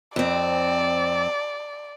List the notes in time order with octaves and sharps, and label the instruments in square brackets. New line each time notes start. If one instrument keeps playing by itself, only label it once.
[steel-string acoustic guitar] F2 C4 [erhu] D5